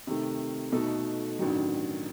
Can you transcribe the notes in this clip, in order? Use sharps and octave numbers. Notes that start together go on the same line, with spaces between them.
C3 D#3 A3
B2 A3 D#4 A4
A1 G2 D#3 F#3